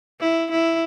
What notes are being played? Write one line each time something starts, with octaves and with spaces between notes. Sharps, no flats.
E4
E4